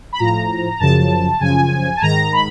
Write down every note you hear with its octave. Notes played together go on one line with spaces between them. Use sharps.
B5
A2 F3 A#5
F#2 C#3 F3 A5
F#2 C#3 F3 G#5
A5
G#2 D#3 A#5
B5